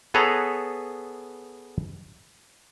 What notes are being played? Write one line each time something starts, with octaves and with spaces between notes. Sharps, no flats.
B3 G#4 A4 B4 C#5 A#5